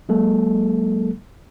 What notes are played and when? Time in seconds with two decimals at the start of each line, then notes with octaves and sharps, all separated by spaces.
0.09 F#3 G#3 A#3 A4